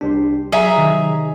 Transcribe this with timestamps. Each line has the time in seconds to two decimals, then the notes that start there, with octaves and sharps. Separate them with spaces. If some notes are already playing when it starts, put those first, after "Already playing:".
0.01 C2 D4 G4 C6
0.52 F#3 G#4 E5 A#5
0.76 C3 D#3